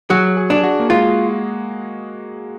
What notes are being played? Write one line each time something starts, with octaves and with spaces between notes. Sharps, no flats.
F#3 G#4
G#4
D4
G#4
F#4
A#3
G#3 F4